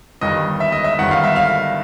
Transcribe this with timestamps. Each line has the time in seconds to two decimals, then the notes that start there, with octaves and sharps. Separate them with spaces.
0.21 G1 G2 D#3 D#5
0.60 E5
0.72 D#5
0.84 E5
0.98 G1 G2 D#3 F#5
1.11 F5
1.24 E5
1.36 F5